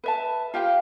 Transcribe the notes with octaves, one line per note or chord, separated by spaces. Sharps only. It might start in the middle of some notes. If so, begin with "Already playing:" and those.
B4 E5 A5
F4 G4 F5 G5